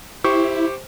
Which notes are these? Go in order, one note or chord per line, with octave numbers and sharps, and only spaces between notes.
E4 G4 C5 C#6